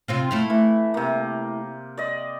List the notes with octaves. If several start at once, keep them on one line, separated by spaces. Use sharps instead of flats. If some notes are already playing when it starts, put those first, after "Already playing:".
C3 C4 F4
A3 E4 F5
E3
C3 A#3
D5 D#5